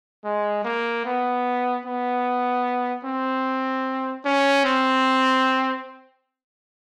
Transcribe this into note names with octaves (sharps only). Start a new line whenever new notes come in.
G#3
A#3
B3
B3
C4
C#4
C4